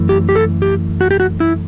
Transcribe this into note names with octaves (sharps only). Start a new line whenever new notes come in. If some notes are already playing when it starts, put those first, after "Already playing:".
Already playing: F#2 E3 A3
G4
G4
A4
G4
F#4
G4
F#4
E4